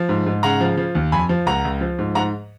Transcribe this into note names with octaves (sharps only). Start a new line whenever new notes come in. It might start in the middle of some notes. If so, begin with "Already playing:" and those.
Already playing: F3
G#2
G#2
C#3 F#5 A#5
F3
F3
D#2
F2 G#5 B5
F3
C#2 F#5 A#5
C#2
F3
G#2
G#2 F#5 A#5